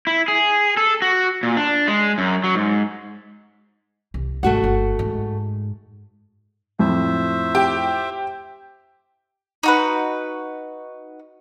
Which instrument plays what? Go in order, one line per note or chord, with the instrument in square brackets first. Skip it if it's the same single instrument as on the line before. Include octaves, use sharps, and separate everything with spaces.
[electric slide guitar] E4
G#4
A4
F#4
A#2
D4
G#3
F#2
F#3
G#2
[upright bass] C2
[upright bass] G#1 [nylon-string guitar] A3 F#4 F#5
[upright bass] G1
G#2
[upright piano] F2 A2 [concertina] C5 E5
[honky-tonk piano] G4
[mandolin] D#4 F#4 B4